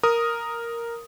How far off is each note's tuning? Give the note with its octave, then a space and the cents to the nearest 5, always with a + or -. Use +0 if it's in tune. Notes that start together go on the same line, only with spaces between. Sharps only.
A#4 +0 D#6 +0